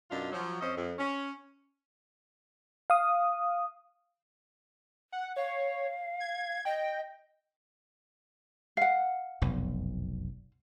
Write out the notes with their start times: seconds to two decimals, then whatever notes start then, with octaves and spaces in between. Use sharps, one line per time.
0.11 F#2 B2 D4 D#4 F4
0.32 F3 F#3
0.61 F2 C#4 C5 D#5
0.77 F2
0.98 C#4
2.90 F5 D#6
5.12 F#5
5.36 C#5 F5
6.20 G#6
6.65 D#5 G5
8.77 F5 F#5
9.42 F1 B1 F#2